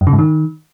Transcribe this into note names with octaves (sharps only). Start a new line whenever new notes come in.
F#2
C#3
G#2
D#3